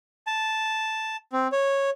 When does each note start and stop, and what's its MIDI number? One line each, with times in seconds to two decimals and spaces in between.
0.27 1.17 81
1.33 1.48 60
1.52 1.90 73